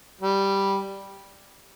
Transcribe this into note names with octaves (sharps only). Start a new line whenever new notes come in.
G3